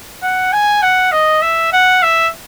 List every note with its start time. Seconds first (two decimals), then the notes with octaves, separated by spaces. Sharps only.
0.23 F#5
0.52 G#5
0.82 F#5
1.12 D#5
1.42 E5
1.73 F#5
2.02 E5